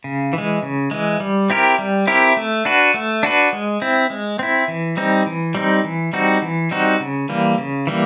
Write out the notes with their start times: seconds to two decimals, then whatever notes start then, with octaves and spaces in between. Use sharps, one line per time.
0.04 C#3
0.33 E3
0.38 G#3
0.63 C#3
0.91 E3 G#3
1.20 G3
1.50 C4 E4 G4 A#4
1.79 G3
2.07 C4 E4 G4 A#4
2.37 A3
2.65 D4 F#4 B4
2.94 A3
3.23 D4 F#4 B4
3.53 G#3
3.82 C4 E4
4.10 G#3
4.39 C4 E4
4.68 E3
4.97 G3 C4 D#4
5.26 E3
5.55 G3 C4 D#4
5.84 E3
6.13 G3 C4 D#4 F#4
6.42 E3
6.71 G3 C4 D#4 F#4
7.00 C#3
7.29 E3 G3 A#3
7.58 C#3
7.87 E3 G3 A#3